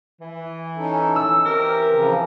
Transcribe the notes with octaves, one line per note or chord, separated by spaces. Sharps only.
E3
C#4 D#4 A4
E6
E3 C4 G4 A#4
C#3 E3 F3